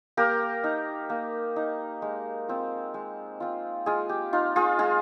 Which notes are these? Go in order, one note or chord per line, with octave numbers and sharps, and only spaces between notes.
A#3 G4 A#4
D#4
A#3
D#4
G#3
C4 F4
G#3
C4 F4
G#3 F4 G#4
G4
D#4 F4
F4 G#4
G#3 F4 G#4